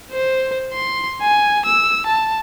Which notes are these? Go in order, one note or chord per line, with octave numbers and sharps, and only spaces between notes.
C5
C6
G#5
E6
A5